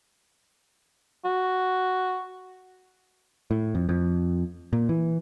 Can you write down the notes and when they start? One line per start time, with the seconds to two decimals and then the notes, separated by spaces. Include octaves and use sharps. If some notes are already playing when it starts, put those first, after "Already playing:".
1.25 F#4
3.51 A2
3.75 F2
3.89 F2
4.73 A#2
4.89 E3